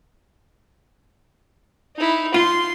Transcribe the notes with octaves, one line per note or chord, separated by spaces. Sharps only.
D#4 E4
F4 C6